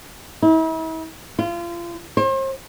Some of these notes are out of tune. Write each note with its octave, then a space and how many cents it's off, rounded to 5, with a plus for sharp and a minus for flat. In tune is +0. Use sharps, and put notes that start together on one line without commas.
E4 -40
F4 -30
C5 +40